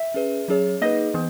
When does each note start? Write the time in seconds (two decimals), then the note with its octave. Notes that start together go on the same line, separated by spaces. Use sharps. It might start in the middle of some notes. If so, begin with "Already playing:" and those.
Already playing: E5
0.14 C#4 G#4 B4
0.48 F#3 C#4 G#4 C#5
0.81 A#3 D#4 G#4 B4 D#5
1.14 E3 B3